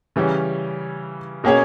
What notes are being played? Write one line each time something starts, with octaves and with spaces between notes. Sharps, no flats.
C#3 E3 G3 C#4
B2 A#3 C#4 G#4 C#5